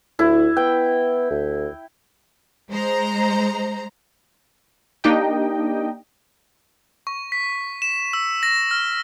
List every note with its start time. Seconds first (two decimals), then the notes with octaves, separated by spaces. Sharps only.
0.19 D2 E4
0.57 B3 G5
1.31 D2
2.71 G#3 C5 A#5
5.04 A#3 D4 D#4 G4 D#5 G5
7.07 C#6
7.32 B6
7.82 E7
8.13 E6
8.43 A#6
8.71 F6